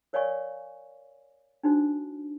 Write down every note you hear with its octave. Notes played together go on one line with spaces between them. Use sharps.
A#4 C#5 D5 F5 G#5 C#6
D4 D#4 F#4 C5